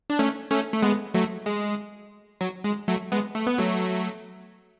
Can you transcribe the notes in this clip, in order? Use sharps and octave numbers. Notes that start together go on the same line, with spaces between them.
D4
A3 C#4
A3 C#4
A3
G#3 B3
F#3 A3
G#3
F#3
G#3
F#3 A3
G#3 B3
A3
B3
F#3 A3